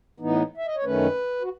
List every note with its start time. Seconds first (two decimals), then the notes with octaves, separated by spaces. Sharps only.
0.20 A2 E3 B3 D#4
0.57 E5
0.66 D#5
0.75 C#5
0.84 F#2 D#3 A3 C#4 B4
1.42 F#4